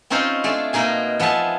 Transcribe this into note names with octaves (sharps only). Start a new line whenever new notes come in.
C4 C#4 D#4 F4 C5 C#5
A3 D4 G#4 D5
B2 A#3 D#4 G#4 G#5
F3 B3 G#4 E5 A5